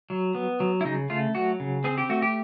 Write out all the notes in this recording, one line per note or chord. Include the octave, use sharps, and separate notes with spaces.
F#3
B3
F#3
E4
C#3 D#4
A3 F4
F#3 F#4
C#3
C4 G#4
G4
A3 F#4
G4